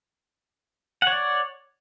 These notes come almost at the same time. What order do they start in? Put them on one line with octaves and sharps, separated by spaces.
F#5 C#5 D5